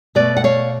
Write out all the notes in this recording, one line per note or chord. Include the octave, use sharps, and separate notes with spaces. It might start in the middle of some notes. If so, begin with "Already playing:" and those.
B2 A3 B4 D5
F#5
C#5 F5